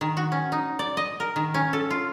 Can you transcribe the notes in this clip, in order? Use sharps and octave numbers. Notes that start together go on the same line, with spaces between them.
D#3
F#4
C#4
D#4
D5
D#5
A#4
D#3
C#4
A4
F4